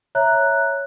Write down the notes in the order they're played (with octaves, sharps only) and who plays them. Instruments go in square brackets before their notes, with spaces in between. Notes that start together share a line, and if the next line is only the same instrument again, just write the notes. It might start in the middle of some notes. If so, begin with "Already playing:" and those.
[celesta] C#5 E5 A#5 F#6